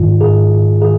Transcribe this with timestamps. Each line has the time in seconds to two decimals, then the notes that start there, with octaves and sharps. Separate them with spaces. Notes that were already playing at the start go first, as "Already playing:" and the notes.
Already playing: G#2 D#3 F4
0.21 G#2 G#4
0.51 G#2
0.81 D#3 G#4